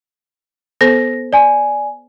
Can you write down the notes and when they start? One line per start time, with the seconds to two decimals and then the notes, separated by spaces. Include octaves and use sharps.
0.81 B3 A4 C5 A#6
1.33 D5 G#5